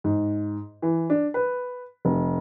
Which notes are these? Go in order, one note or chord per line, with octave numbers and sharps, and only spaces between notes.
G#2
E3
D4
B4
F1